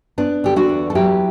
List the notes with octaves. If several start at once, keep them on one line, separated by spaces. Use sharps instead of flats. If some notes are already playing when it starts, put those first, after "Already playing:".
B3 D4
D3 G4
D4 F#4
E2
A4
F#3 E4 G4